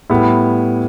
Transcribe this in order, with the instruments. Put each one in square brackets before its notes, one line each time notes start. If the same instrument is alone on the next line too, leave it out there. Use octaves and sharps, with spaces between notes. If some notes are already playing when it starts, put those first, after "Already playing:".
[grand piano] A2 G3 B3 E4